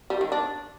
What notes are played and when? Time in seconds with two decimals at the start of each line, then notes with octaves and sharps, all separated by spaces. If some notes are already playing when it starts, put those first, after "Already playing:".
0.10 G3
0.21 D#3
0.32 D4